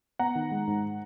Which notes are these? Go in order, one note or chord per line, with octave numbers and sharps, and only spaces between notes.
B3 F#5 A#5
D#3
G#3
G#2